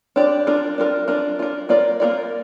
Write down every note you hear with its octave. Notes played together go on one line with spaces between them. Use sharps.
D4 G4 D5
D4 F4 A#4
D4 F4 A#4
D4 F4 A#4
D4 F4 A#4
A#3 F4 A#4 D5
A#3 F4 A#4 D5